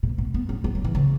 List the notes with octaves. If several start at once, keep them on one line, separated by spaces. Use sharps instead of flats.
B2
B2
B3
C#4
B3
F#3
E3
C#3